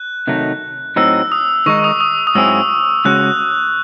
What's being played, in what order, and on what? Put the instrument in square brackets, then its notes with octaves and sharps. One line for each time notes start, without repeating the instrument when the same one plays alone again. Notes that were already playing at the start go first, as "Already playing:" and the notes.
Already playing: [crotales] F#6
[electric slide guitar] C3 D#3 F#3 A3 D#4
[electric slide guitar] A2 F#3 C4 D#4 [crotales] E6
[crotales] D#6
[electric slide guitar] D#3 G#3 D#4 [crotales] C#6
[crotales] D#6
D#6
D#6
[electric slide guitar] G#2 F#3 C4 E4 G#4 [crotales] E6
[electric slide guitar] C#3 G#3 C#4 F#4 [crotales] F#6